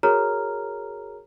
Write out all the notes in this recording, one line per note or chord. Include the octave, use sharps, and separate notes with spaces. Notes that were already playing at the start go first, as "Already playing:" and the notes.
F#4 G#4 A#4 C#5 A#5 F6